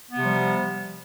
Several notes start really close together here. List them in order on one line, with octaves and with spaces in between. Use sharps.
B3 C3 G3 F3